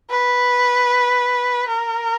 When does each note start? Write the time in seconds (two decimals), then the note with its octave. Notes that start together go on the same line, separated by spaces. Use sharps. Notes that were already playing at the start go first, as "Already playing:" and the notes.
0.10 B4
1.68 A#4